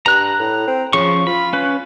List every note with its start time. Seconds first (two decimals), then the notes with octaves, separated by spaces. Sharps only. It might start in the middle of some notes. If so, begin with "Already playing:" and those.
0.06 G2 A#5 F#6
0.39 A2
0.67 C4
0.93 C#3 F3 C#4 C#6
1.27 F4 B5
1.53 C#4 B4